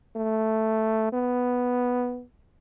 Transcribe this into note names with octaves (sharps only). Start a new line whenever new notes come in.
A3
B3